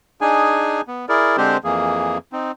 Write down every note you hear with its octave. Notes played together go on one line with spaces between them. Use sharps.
D4 D#4 G#4 G#5
B3
E4 G#4 A#4 D5
D3 G#3 C4 D4 G4 C5
F2 E3 A#3 G#4
C4 D#4